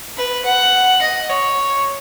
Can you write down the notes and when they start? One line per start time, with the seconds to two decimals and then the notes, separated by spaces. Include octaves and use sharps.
0.17 B4
0.45 F#5
1.01 D#5
1.29 C#5